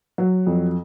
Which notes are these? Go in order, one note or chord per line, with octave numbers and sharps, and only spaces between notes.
F#3
F2